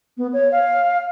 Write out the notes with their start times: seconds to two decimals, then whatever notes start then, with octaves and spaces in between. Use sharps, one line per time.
0.17 B3
0.33 C#5
0.52 F5